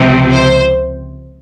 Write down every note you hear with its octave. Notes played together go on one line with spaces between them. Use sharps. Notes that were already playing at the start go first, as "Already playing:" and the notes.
Already playing: C#2 C3 F3 C4
C5